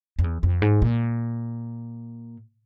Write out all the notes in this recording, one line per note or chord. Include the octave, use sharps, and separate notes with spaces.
F2
E2
F2
G#2
A#2